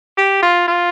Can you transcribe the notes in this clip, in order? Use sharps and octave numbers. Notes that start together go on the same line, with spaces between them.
G4
F4
F4